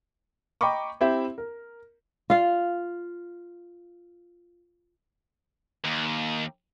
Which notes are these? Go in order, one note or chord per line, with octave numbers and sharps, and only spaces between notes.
D#5 G5 A#5 B5 C#6 D6
C4 E4 G4 C5 E5
A#4
F4 F5
D#2